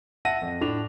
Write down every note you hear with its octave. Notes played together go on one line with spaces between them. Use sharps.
E5 F#5 A5 E6 A#6 D#7
F2
A2 D4 F7